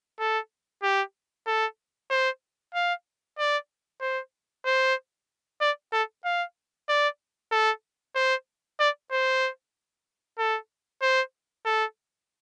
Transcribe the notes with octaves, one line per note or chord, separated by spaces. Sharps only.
A4
G4
A4
C5
F5
D5
C5
C5
D5
A4
F5
D5
A4
C5
D5
C5
A4
C5
A4